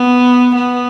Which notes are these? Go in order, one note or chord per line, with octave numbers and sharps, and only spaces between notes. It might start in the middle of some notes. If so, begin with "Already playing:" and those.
Already playing: B3
B3